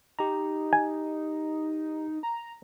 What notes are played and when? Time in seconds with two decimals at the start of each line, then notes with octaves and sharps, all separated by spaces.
0.19 D#4 G4 A#5
0.73 G#5
2.23 A#5